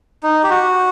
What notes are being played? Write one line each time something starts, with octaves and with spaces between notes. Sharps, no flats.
D#4
G4
F#4